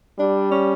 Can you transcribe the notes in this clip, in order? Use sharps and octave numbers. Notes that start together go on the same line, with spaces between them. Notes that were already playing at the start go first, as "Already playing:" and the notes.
G3 D4
C#4